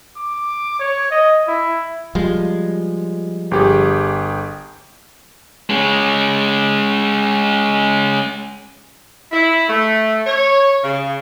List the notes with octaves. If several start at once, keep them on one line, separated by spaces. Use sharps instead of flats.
D6
C#5
D#5
E4
F3 G3 G#3
G1 G4 G#4
G#3 C#4
E4
A3
C#5
C#3